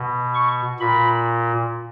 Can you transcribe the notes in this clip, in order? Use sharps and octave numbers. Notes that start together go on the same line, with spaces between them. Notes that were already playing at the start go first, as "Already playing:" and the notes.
Already playing: B2
C#6
A#2 B5